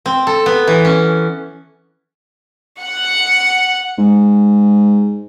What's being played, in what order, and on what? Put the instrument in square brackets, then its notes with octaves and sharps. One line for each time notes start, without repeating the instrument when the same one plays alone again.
[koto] C4
A4
B3
E3
C#4
[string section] F#5
[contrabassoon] G#2